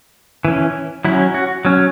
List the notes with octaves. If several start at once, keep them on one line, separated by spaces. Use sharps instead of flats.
E3 C#4
F#3 C#4 E4
F#4
F#3 C#4